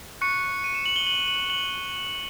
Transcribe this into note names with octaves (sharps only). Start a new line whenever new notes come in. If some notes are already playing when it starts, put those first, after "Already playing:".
C#6 F#6 C#7
D#7
E7
F#7
G7
F#7
F#7
F#7